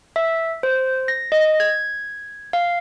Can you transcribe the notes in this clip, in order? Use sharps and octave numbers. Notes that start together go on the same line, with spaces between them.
E5
C5
A#6
D#5
G#6
F5